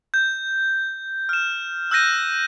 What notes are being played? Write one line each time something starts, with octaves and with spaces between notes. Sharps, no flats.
G6
F6 E7
E6 F#6 G6 A#6 D#7